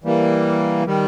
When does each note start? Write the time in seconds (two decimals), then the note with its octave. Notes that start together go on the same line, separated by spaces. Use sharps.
0.04 E3 G3 A#3
0.86 D#3 G3